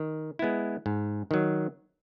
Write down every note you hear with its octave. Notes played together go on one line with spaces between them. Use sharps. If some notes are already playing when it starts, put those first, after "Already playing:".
Already playing: D#3
G#3 B3 E4
G#2
D#3 F#3